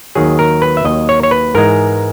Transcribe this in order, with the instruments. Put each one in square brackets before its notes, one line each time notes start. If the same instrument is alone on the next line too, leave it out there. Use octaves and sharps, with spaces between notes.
[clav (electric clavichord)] D#2 D#3 F#3 G#4
A#4
B4
E5
D#2 D#3 F#3 D#5
C#5
C#5
B4
G#2 E3 G#3 A#4